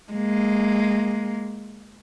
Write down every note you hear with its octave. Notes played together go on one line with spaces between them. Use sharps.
G#3 A#3